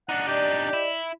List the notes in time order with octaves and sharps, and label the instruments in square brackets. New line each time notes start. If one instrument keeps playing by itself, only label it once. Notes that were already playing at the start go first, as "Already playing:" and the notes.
[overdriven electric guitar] D4 D#4 [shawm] F#5 [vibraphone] D6
[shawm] G4 [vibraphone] D5 D#5
[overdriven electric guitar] E4